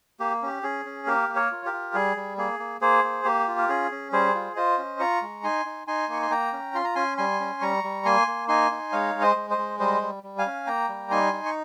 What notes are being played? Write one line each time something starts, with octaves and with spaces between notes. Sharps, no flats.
A#3 G4
C#4 G4
C#4 G#4
C#4
A#3 G4 A#4
A#3
A#4 C#5
F4
G4 A#4
F4
G3 G#4
G3
A#3 G#4
A#3
A#3 G#4 C5
A#3
A#3 G4
F4
A#4
C#4 G#4
C#4
G3 G#4 C5
F4
F4 C5 D#5
C#4
F4 A#5 C#6
G#3
D#4 G#5 C6
D#4
D#4 G#5 C6
A#3 C#6
C6
A#3 G5 A#5
C#4
F4 C6
A#5
C#4 G#5 C6
G3 G#5 C6
C#4
G3 A#5 C#6
G3
A#3 G#5 C6
A#3
D#4 G#5 C6
D#4
G#3 C#5 F5
G#3
C5 D#5
G#3
C5 D#5
G#3
G3 C5 D#5
G3
G3
F5 G#5
C#4
A#3 G5 A#5
G3
D#4 G#5 C6
D#4
C#6